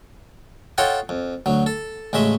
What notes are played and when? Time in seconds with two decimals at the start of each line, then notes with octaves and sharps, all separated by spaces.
0.78 F4 A4 C#5 D#5 F#5 G5
1.09 F2
1.46 D2 F#3
1.66 A4
2.13 A1 C#3 G#3 D#5 E5